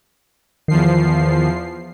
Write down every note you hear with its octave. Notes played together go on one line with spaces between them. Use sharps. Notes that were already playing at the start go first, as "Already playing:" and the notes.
E2 D#3 F3 C7